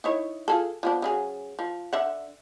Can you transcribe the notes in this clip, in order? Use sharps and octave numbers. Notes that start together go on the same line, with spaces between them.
D#4 E4 C#5
F4 G#4 A4
F3 B3 D4
C#3 F#3 G#4
F3
D3 E5 F#5